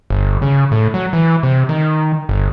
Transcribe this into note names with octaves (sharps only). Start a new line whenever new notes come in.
G1
C#3
A2
F#3
E3
C3
D#3
G1